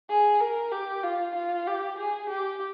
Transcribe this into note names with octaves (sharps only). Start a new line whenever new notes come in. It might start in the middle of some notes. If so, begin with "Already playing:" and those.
G#4
A#4
G4
F4
F4
G4
G#4
G4